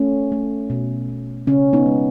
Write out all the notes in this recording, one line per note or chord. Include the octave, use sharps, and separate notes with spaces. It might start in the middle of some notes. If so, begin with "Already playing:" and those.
Already playing: A3 C#4
A3
B2
B2
C#3 C#4
B3 D#4
G#3